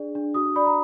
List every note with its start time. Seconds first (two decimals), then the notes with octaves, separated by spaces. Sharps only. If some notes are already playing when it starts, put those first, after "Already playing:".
Already playing: D4 G#4 D5
0.15 D4
0.34 F#4 D#6
0.56 D5 B5
0.66 A#5